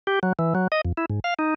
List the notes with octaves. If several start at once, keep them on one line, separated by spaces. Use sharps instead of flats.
G4
F#3
E3
F#3
D#5
F2
E4
G#2
F5
D#4